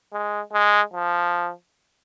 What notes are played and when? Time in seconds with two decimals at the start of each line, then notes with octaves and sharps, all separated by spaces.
0.13 G#3
0.53 G#3
0.93 F3